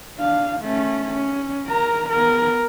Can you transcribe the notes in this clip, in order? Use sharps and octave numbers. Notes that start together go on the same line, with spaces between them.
D4 F5
A3 C#4
C#4
A#4 A#5
B3 A#4